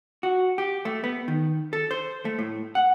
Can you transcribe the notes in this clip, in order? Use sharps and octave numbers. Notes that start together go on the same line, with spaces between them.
F#4
G4
A3
B3
D#3
A4
C5
A3
A2
F#5